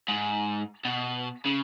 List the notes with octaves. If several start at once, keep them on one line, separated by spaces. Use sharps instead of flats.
G#2
B2
C#3